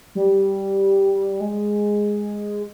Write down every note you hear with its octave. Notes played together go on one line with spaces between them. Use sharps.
G3
G#3